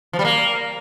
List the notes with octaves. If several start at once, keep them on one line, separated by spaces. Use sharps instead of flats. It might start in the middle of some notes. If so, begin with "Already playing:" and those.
F3
G3
A#3